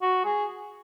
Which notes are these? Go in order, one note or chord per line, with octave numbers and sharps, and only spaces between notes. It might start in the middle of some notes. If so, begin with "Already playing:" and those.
F#4
G#4